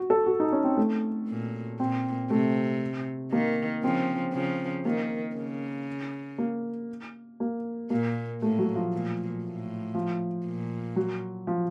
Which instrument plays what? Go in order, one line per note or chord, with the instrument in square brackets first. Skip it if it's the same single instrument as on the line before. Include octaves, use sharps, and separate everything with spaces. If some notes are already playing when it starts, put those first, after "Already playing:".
Already playing: [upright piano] F#4
A4
F#4
D#4
C#4
C4
A3
[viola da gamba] A#2
[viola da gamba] A#2 [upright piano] C4
[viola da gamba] C3 [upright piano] A3
[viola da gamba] D#3 [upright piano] A#3
[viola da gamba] C#3 F3 [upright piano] C4
[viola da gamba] C#3 F3
[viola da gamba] D#3 [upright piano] A#3
[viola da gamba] C#3
[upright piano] A#3
A#3
[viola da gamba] A#2 [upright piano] A#3
[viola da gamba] A2 [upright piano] A3
[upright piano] F#3
F3
[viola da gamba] A#2
A2
[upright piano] F3
[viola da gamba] A#2
[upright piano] F#3
F3